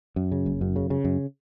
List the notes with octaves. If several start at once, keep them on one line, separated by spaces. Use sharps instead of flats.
F#2
C#3
F#1
F#2
C#3
C#3
F#2